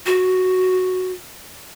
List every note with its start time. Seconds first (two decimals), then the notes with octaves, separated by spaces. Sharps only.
0.06 F#4